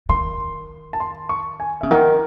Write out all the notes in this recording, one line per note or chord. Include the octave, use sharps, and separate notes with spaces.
D#3 C6
A5
C6
C#6
G#5
C#3 E5
D#3 F#5